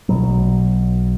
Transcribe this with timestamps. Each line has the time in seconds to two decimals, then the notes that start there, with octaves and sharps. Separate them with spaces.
0.09 B1 B2 F#3